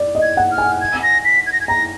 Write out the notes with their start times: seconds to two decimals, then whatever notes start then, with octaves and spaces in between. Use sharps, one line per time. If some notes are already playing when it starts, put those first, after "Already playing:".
Already playing: D5
0.15 D#5
0.22 G#6
0.37 F#5
0.51 F6
0.58 G#5
0.81 G#6
1.03 A#6
1.25 B6
1.46 G#6
1.53 A#6
1.61 G#6
1.68 A#5 A#6